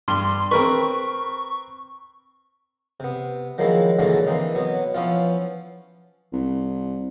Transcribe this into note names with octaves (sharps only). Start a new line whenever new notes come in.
G2 C6
C4 A#4 B4 C#6
C3 B3
D#3 F3 F#3 G#3 A#3 E4
A#2 D3 E3 F#3 G#3 A#3
E3 A#3 C4 D#4
B2 F#3 B3
F3 B3 C#4 E4 F4
C2